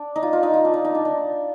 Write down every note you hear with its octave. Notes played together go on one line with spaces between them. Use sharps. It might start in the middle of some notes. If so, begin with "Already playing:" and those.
Already playing: D4
D#4
F4
F4
D#4
F4
D4
D#4
D#4
D4
D4